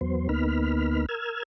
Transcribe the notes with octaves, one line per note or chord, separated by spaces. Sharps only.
E2 F#3 B3 C5
D2 A#3 B3 D#4 B5 F6
A#4 E6 F6 G#6